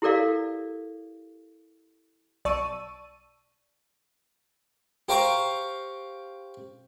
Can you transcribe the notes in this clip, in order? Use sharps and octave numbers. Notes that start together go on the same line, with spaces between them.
E4 G4 A4 A#4 D5 F5
B1 D5 A5 C#6 E6 D#7
G4 C5 F5 A#5 C#6 D6